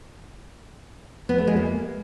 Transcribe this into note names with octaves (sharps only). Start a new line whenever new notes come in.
B3
A3
G#3
A#3